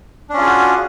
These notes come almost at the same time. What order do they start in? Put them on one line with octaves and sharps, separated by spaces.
D4 C#4 F4 G#4 F#4